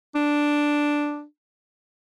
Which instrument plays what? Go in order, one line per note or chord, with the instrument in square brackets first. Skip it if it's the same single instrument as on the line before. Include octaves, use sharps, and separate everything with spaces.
[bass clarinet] D4